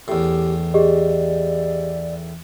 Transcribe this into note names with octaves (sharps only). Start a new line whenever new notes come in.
E2 A2 G4
G4 G#4 D5 D#5